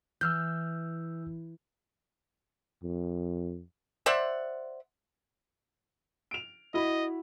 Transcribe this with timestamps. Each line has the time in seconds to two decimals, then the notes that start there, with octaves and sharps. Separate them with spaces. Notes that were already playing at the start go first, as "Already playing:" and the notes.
0.21 E3 E6 F6 G6
2.83 F2
4.06 C5 D5 E5 F#5
6.31 D7 F7
6.74 E4 F#4 D#5 B5